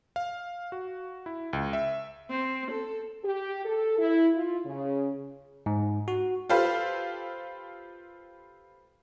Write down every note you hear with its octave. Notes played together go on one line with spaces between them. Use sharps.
F5
F#4
E4
C#2
E5
C4
A4
G4
A4
E4
F4
C#3
G#2
F#4
F4 G4 A4 B4 C5 F5